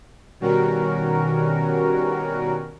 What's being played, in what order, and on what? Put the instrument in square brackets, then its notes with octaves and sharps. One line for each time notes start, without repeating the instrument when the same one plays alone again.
[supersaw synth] B2 D#3 G3 C#4 F#4 A#4